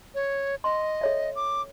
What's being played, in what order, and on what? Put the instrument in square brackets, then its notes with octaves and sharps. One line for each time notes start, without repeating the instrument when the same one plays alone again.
[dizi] C#5
[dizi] D#5 [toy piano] C6
[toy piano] A4 C#5 E5
[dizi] D6